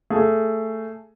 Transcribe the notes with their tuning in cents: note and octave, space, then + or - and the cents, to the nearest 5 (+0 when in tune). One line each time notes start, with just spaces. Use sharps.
A3 +10 G#4 +10